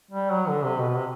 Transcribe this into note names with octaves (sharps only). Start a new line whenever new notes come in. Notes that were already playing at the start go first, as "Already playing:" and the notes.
G3
F#3
D3
C3
B2
C3